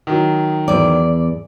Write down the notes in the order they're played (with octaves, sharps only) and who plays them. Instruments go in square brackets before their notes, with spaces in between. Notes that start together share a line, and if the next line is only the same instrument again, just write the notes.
[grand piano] D#3 F#3
[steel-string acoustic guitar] E2 D5